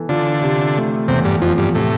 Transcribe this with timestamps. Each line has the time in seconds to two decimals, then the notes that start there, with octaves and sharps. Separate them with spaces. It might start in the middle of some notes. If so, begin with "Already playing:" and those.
Already playing: E3 B3 A4
0.09 D3 F4
0.42 C3
0.76 A3
1.08 E2 C3
1.24 G2
1.42 F2 F3
1.58 G2
1.75 A2 C3